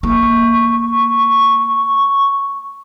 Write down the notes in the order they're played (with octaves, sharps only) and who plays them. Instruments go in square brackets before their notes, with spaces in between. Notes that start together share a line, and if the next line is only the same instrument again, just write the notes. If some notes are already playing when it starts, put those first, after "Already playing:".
[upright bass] A#3 [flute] C#6